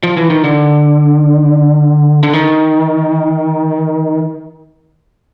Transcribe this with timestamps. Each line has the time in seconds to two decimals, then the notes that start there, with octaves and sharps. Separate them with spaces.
0.03 F3
0.17 E3
0.30 D#3
0.44 D3
2.23 D3
2.33 D#3